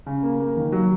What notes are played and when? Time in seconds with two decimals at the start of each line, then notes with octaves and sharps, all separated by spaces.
0.06 C#3
0.23 A#3
0.40 A#3
0.57 D#3
0.72 F#3